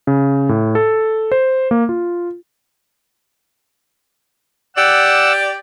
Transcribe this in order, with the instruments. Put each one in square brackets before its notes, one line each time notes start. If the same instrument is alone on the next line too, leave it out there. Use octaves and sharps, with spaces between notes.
[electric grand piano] C#3
A2
A4
C5
A#3
F4
[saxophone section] G4 D5 [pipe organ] F#5 E6